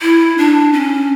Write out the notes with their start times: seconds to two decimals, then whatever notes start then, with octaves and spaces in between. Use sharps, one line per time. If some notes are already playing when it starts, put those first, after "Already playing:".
0.02 E4
0.38 D4
0.73 C#4